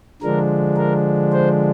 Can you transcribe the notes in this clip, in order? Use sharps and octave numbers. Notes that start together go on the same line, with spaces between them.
D3 F3 G#3 D4 A#4
A#4
C5